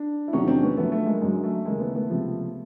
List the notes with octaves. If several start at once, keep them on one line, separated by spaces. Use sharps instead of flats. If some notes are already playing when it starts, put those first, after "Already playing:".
Already playing: D4
E4
E2 C3 D#3 F#3 C#4 D#4
C4 D4
B3 C#4
F#2 D3 F3 A3 B3
A3
G#3 A#3
F#2 D3 F#3 G#3
A3
D#2 C#3 E3 G#3 A#3
A3 B3
A3 B3
C#2 C3 F3